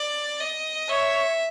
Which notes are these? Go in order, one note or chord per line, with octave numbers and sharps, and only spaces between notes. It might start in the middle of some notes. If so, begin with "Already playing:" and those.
Already playing: D5
D#5
C#5 E5